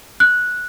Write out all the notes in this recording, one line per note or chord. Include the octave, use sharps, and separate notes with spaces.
F#6